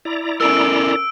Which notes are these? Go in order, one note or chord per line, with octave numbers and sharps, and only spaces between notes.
E4 D5 A#5
C#4 A4 A#4 E6 D7